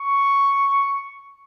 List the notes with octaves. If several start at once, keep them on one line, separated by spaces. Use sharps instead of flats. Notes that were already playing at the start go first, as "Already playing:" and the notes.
Already playing: C#6